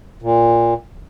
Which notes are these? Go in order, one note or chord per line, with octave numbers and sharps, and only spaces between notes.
A#2